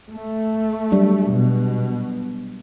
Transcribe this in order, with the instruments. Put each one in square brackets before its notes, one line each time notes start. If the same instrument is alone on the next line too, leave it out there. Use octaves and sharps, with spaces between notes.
[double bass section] A3
[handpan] F#3 G3 D4
[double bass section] B2